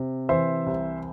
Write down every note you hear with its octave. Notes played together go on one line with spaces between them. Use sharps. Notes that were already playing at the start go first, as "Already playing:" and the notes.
Already playing: C3
E3 C5 E5
C2